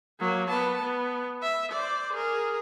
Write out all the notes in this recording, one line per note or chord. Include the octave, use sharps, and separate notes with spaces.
F#3 A#3
B3 A5
B3
E5
C5 D5
G#4 A#4